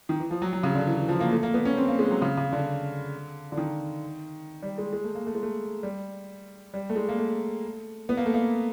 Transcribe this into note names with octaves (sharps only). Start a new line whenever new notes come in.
D#3
E3
F3
F#3
F#3
C#3
D3
E3
E3
F3
A#3
A3
A#3
B3
C#4
C4
A#3
G#3
F#3
C#3
C#3
D3
D3
D#3
G3
G#3
G#3
A3
A#3
A3
G#3
A3
G3
G3
A3
G#3
A#3
A3
B3
A#3
A3
A#3